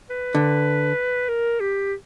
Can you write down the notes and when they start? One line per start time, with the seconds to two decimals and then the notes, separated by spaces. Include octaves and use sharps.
0.10 B4
0.35 D3
1.29 A#4
1.60 G4